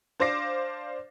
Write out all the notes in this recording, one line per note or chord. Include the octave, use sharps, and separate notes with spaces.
D4 C5 F5 D6 A#6 C7